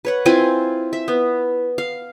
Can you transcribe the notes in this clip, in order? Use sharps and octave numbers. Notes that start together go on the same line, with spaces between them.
B4 C#5 F#5
C4 E4 F4 G#5
E5
B3
F5